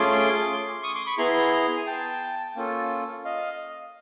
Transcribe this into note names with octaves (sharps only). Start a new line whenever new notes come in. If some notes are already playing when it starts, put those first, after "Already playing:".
Already playing: A3 C#4 F4 G#4 C6 D6
C#6 D#6
C6 D6
B5 C#6
B3 E4 G#4 A#5 C6
G#5
G5 A5
A#3 C#4 F4 A4
D#5 F5